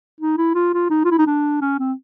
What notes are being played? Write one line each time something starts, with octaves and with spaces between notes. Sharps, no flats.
D#4
E4
F4
F4
D#4
F4
E4
D#4
D4
C#4
C4